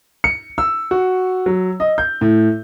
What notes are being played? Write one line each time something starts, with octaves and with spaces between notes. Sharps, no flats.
C#7
E6
F#4
F#3
D#5
G6
A2